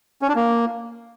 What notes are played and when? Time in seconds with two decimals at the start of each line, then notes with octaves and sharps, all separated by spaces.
0.22 C#4
0.29 D4
0.35 A#3